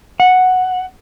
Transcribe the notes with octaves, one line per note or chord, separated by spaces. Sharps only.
F#5